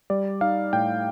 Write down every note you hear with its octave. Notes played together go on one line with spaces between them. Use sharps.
G3 D5
D#4 F5
A2 G5